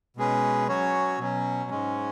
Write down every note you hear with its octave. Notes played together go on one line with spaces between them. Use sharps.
B2 G#3 C#4 G#4 B4
F#3 C#4 F#4 C#5
B2 F#3 C#4
G#2 G#3 C#4